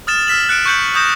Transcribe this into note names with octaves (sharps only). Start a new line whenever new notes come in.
D#6 F6 A6 E7
E6 F6 B6 E7 F#7
F#6 C#7 D7
C#6 F#6 G6 C#7 F#7
C#6 D#6 G6 A#6 E7